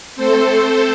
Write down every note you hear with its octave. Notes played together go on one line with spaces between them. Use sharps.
A3 C4 A4 C5